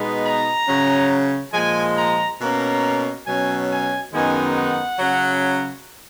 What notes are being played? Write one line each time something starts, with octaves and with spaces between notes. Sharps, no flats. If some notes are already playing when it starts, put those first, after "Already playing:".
Already playing: B2 G#3 B3 D#4
A#5
C#3 F#3 C#4
A#2 F3 G#3 G#5
A#5
B2 A#3 C#4 A#5
B2 F#3 C#4 G#5
G#5
F#2 D#3 G#3 B3 D#4 G#5
F#5
C#3 F#3 C#4